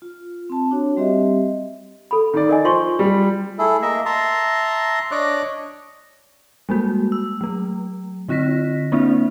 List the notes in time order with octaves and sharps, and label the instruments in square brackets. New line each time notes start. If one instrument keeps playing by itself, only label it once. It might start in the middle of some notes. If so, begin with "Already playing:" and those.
[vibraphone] F4
C4 A5
D4 F#4 C#5
G3 C4 G4 D#5 E5
[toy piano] A4 B5
[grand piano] D#3 D5
[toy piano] A#4 D#5 G#5
[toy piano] F4 C6 C#6 [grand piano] C5
[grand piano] G3
[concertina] A3 E4 G#4 A4
A#3 D#5 E5
E5 A5 A#5 C6
D4 C#5 D#5 D6 F#6
[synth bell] G3 G#3 A#3 F#4
E6
F#3 A3
D3 C4 F4 D#5 A#6 B6
A#3 C4 D4 E4 E5